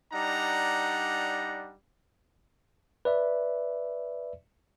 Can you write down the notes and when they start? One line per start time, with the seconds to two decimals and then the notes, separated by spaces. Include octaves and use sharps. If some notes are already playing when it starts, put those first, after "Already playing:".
0.13 G3 D4 D#4 F#5 A#5
3.05 B4 D5 E5